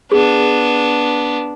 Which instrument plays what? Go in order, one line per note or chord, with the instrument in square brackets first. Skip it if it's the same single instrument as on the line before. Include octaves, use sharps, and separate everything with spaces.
[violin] B3 D4 [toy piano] G#4